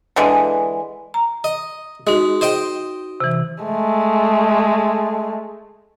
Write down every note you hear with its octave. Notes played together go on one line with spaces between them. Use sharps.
D3 E3 G#3
A#5
D#5
G#3 D#4 F#4
C5 D#5 G5
C3 E3
G#3 A3